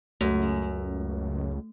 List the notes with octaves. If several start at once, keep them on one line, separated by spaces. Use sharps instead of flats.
C#2 F#2 A3